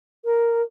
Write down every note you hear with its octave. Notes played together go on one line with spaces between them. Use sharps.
A#4